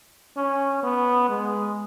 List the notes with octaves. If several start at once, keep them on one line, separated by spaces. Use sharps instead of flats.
C#4
B3
G#3